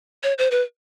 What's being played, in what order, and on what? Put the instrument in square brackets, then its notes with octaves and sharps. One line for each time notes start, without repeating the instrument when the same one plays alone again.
[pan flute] C#5
C5
B4